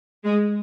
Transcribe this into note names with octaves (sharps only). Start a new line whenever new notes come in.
G#3